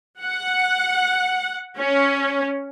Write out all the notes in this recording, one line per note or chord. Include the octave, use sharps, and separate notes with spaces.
F#5
C#4